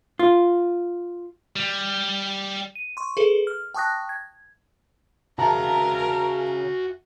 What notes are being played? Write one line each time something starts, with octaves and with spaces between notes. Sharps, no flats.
F4
G3
D#7
C6 C#6
G#4 A4 B4
F6
G5 A5 C#6 D#6 F#6 A#6
G#6
C#3 F#4 A#4 E5 A5 A#5